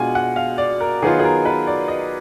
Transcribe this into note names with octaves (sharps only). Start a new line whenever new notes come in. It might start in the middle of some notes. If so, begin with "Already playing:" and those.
Already playing: B2 G#3 D4 F4 F#5 G#5
F#5
F5
D5
A#4
D#3 F#3 B3 F4 G#4
G#4
A#4
B4
D5
D#5